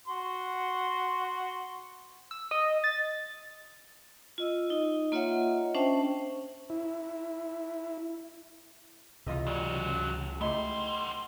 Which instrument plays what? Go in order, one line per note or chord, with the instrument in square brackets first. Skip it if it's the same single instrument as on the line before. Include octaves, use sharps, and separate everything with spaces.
[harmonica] F#4 C6
[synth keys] E6
D#5
A6
[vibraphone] F4 D#5 E6
D#4 D#5
A#3 F4 C#5 D#5 E5 F#5
C#4 D4 C5 E5 G5 A5
[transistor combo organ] E4
[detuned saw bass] C#2 [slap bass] C3 E3 [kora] F4 D#5 E5
[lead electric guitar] G#2 F#3 [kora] G3
[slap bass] A3 [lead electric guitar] B3 C6 [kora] D#4 E4 G4